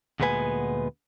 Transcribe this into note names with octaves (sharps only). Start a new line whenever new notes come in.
D2 A#2 G#3 B3 B4 G#5